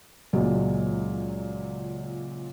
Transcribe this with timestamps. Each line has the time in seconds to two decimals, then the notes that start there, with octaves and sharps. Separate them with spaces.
0.33 C#2 A#2 F#3 G#3